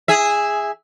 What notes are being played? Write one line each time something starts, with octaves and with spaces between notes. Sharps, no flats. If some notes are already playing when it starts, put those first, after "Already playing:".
G#4 E5